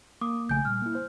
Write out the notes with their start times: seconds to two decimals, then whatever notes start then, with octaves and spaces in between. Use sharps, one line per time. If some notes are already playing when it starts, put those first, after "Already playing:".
0.21 A#3 D6 D#6
0.49 A#1 C#3 A3 G#5 G6
0.65 A#2 G3 F6
0.82 A#3 E4
0.95 C5